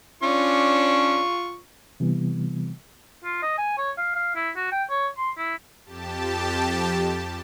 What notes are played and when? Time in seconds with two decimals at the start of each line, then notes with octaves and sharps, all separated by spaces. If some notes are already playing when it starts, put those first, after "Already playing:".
0.23 C#4 D4 F4 C#6
2.00 C3 E3 G3 B3
3.24 F4
3.43 D#5
3.58 G#5
3.78 C#5
3.98 F5
4.15 F5
4.36 E4
4.56 F#4
4.72 G5
4.90 C#5
5.18 C6
5.38 E4
5.86 F2 G4 A5